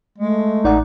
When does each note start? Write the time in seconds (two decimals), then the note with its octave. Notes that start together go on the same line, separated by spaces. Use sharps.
0.18 G#3 A3
0.64 A1 D#4 D5 F#5